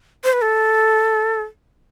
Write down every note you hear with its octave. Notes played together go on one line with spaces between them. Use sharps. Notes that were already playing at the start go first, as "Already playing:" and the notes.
C5
B4
A4